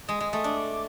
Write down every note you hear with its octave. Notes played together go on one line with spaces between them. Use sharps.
G#3 D#6
G#3
A3 D#6
D4
D6